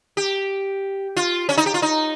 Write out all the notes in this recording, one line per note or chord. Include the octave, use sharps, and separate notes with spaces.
G4
F4
C#4
D#4
G4
F4
D#4